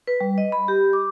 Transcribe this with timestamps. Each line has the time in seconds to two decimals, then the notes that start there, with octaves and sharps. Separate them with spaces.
0.07 B4
0.21 G3
0.38 D#5
0.52 B5
0.68 G4
0.93 D6